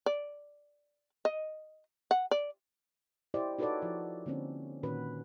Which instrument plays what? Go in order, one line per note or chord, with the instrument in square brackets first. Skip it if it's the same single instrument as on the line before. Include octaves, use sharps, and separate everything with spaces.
[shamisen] D5
D#5
F#5
D5
[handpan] E4 G4 C5 D5 D#5
D#4 F#4 A4 B4 C#5 D5
F3 E4
D3 A#3 C4 C#4
A#2 D#3 C#4 F#4 B4